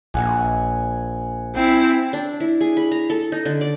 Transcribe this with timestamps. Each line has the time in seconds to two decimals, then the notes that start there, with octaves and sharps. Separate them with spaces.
0.14 A#1 F#5 G#5
1.55 C4 E4
2.13 D4
2.40 E4
2.61 G#4
2.77 B5
2.92 A#5
3.10 A4
3.32 D#4
3.45 D3
3.61 D5